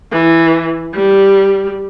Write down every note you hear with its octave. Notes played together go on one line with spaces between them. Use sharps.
E3
G3